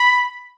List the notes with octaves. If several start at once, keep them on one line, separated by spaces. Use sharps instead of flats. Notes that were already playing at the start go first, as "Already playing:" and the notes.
Already playing: B5